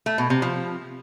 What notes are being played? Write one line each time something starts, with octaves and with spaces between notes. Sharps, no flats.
A3
B2
C3
F3